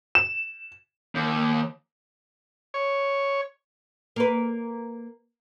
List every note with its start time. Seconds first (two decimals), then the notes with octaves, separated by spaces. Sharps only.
0.15 E7
1.15 D#2
2.74 C#5
4.16 A#3 B4